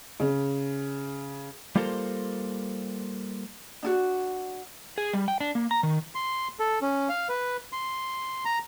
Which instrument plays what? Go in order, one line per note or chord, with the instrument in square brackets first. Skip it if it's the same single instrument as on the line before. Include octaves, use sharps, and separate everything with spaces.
[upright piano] C#3
[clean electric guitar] G3 A#3 F4 A4 A#4 C5
[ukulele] D4 E4 F#4
[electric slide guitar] G#4
G3
G5
D4
A#3
A#5
D#3
[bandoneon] C6
A4
C#4
F5
B4
C6
A#5